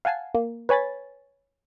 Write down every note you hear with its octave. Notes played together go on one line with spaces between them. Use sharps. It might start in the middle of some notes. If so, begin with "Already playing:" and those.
F5 F#5 G#5 A5 C7
A#3
B4 C#5 G#5 B5 A6